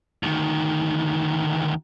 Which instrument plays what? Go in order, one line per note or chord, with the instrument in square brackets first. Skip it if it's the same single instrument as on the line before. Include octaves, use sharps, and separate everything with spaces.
[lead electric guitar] D2 D#3